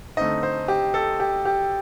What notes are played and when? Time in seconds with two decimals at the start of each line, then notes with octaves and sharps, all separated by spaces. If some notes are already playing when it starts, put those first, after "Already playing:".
0.17 D3 A3 C4 D#4 D#5
0.43 C5
0.68 G4
0.94 A4
1.20 G4
1.45 G4